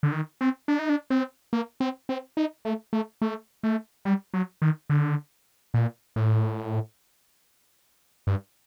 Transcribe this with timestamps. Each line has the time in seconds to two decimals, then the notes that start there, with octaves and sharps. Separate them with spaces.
0.03 D3
0.12 D#3
0.41 C4
0.68 D4
0.79 D#4
0.89 D4
1.10 C4
1.53 A#3
1.80 C4
2.09 C4
2.37 D#4
2.65 A3
2.93 A3
3.22 A3
3.63 A3
4.05 G3
4.34 F#3
4.62 D#3
4.90 D3
5.74 A#2
6.16 A2
8.27 G2